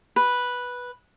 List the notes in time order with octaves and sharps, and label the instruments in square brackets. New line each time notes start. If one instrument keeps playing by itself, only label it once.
[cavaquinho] B4